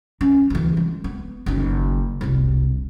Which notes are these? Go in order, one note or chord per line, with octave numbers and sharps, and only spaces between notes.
C#4
D2 E3
G#3
B3
F#1 D#3
E1 C2